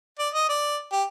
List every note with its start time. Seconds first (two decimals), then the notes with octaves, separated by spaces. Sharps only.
0.19 D5
0.34 D#5
0.49 D5
0.92 G4